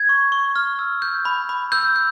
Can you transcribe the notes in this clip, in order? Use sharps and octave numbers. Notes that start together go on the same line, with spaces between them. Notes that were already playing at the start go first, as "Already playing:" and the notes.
Already playing: G#6
C#6
C#6
F6
E6
G6
B5
B5
E6 G6
G6